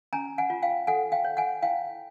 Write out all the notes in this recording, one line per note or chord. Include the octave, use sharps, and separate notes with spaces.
C#4 G#5 A#5
F#5 G#5
F4
F5 G5
A4 F#5 G#5
F5 G5
C#5
F#5 G#5
E4 F5 G5